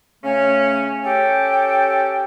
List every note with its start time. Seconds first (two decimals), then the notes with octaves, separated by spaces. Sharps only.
0.23 C#3 A3 C#4
1.04 C#4 G4 A4 G5